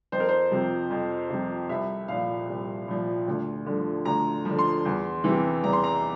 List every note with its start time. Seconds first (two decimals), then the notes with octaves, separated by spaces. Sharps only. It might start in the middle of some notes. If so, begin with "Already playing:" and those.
0.12 F2 C5
0.20 A#4
0.29 C5
0.51 C3 F3
0.90 F2
1.30 C3 F3
1.69 C2 E5
2.08 A#2 F3 F5
2.48 C2
2.88 A#2 F3
3.28 D2
3.66 D3 F3
4.05 D2 A#5
4.45 D3 F3
4.58 C6
4.85 E2
5.24 C3 E3
5.63 E2 A#5
5.73 C6
5.84 A#5